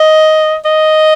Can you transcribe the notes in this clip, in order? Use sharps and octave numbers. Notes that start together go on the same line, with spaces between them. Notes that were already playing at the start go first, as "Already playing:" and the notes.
Already playing: D#5
D#5